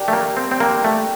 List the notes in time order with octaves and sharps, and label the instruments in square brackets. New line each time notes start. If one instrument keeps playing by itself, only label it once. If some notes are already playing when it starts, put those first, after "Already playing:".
Already playing: [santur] G3 D4 G4 A#4
[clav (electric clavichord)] A3
A#3
C4
C4
[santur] G3 D4 G4 A#4 [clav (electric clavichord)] A#3
[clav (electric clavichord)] A3